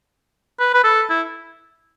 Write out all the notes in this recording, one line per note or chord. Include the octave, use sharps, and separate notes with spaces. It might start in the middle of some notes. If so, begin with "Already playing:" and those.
B4
B4
A4
E4